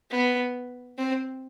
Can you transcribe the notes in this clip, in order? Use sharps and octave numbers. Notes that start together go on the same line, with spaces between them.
B3
C4